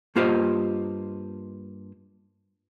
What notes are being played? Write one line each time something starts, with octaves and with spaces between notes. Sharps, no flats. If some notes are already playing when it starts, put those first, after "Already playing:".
G2 A#3 F4 G4 C5 D#5